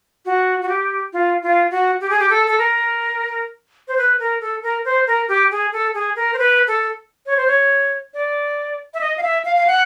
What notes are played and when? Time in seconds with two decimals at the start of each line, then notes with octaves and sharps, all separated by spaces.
0.25 F#4
0.62 F#4
0.69 G4
1.13 F4
1.42 F4
1.71 F#4
2.01 G4
2.10 G#4
2.19 G4
2.30 A4
2.47 A4
2.58 A#4
3.88 C5
3.98 B4
4.19 A#4
4.41 A4
4.63 A#4
4.85 C5
5.07 A#4
5.28 G4
5.51 G#4
5.73 A4
5.94 G#4
6.16 A#4
6.34 C5
6.38 B4
6.68 A4
7.26 C#5
7.37 C5
7.47 C#5
8.14 D5
8.94 E5
9.01 D#5
9.17 F5
9.23 E5
9.45 F5
9.56 F5
9.67 F#5